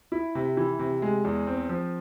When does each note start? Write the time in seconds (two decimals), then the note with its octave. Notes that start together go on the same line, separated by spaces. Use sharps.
0.12 E4
0.35 C3
0.57 E3
0.79 C3
1.02 G#3
1.24 E2
1.47 C4
1.69 F3